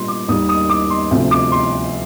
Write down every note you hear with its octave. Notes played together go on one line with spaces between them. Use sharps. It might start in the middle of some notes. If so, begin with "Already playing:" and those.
Already playing: A#2 G3 A#3 D4 F4 C6
D6
D#2 D#3 G3 A#3 D#6
D#6
D6
C6
D2 C3 F3 C4
D6
C6